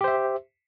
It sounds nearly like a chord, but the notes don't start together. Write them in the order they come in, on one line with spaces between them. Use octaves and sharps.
G4 C5 E5